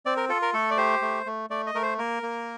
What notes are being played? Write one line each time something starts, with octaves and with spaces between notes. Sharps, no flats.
C4 D5
A#4
F4 A4
A#4
A3 A4
D5
G4 C5
A3
A3
A3 D5
D#5
A3 A#4
C5
A#3 A#4
A#3